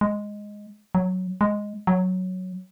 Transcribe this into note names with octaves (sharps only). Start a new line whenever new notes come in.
G#3
F#3
G#3
F#3